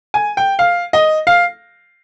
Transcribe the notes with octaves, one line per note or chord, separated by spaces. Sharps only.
G#5
G5
F5
D#5
F5